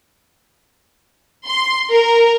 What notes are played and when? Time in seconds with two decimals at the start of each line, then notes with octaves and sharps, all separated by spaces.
1.46 C6
1.90 A#4